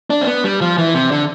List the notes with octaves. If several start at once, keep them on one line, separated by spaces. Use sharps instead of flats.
D4
C4
B3
G3
F3
E3
C3
D3